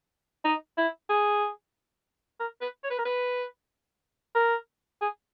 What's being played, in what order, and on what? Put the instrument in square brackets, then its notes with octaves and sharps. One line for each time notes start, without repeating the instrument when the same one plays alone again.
[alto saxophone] D#4
E4
G#4
A#4
B4
C#5
B4
A#4
B4
A#4
G#4